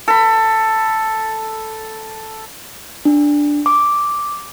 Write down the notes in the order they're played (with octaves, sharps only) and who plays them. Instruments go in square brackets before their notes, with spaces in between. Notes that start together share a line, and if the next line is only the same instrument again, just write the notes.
[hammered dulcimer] A4 B5
[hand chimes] D4
D6